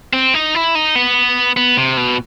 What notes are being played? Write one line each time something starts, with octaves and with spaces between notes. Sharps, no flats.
C4
D#4
E4
D#4
B3
B3
C3
B2